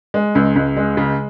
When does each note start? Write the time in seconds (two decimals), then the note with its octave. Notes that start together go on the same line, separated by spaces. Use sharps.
0.14 G#3
0.35 C#2
0.56 C#2
0.77 G#3
0.97 C#3